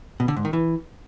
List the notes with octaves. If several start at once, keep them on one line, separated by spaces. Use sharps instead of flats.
B2
D3
G#2
D#3
E3